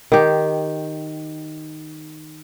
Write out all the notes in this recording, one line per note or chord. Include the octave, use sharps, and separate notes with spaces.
D#3 G4